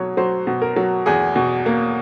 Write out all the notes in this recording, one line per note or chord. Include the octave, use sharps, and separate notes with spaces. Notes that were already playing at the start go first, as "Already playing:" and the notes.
Already playing: B2 F#3 C#5
F#3 C5
B2
A#4
F#3
E2 G#4
B2
A#3